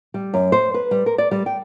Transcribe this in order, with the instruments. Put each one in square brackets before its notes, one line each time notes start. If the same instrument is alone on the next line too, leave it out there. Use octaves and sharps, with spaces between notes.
[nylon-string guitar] G3
F#2
C5
B4
G3
A#4
D5
G3
G5